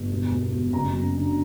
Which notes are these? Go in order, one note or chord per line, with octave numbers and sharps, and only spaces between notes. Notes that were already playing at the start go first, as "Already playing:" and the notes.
Already playing: G1
E1
E1
E1
F#1 A#5
F#2
D3